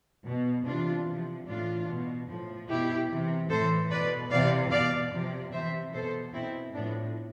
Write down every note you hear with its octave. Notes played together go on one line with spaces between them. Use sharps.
B2
C3 E3 D4 F4
C3 F3
A2 E3 D4 F4
B2
A2 F3
B2 E4 G4
C3 E3
A2 E3 A4 C5
B2 B4 D5
C3 E3 D5 F5
B2 D5 F5
C3 F3
C3 E3 C5 E5
B2 A4 C5
B2 C4 E4
A2 F3 B3 D4